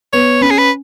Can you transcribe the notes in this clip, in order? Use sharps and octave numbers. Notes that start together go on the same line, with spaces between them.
B3 C#5
C#4 B4
G#4
B4